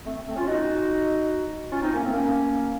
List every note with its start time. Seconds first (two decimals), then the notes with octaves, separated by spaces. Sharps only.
0.05 A3 C4
0.27 A3 C4
0.36 C#4 F4
0.47 D#4 F#4
1.72 C#4 F4
1.81 C4 D#4
1.92 A#3 C#4
2.03 A3 C4
2.13 A#3 C#4